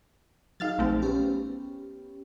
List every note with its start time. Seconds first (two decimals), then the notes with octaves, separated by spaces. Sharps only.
0.60 F#3 D#4 G#4 F5 F6 A6
0.78 A#1 A3 C4
1.02 B3 C#4 G4